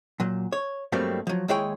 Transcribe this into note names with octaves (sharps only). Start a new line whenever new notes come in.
A#2 F#3
C#5
G2 F#3 G3 A3 A#3 C4
F3 F#3
D#2 G#3 E4 G#4 C#5 G5